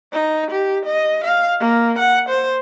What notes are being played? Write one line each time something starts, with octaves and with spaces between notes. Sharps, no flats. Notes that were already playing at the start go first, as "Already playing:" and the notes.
D#4
G4
D#5
F5
A#3
F#5
C5